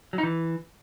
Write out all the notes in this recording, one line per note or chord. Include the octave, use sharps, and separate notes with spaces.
F#3
D#4
E3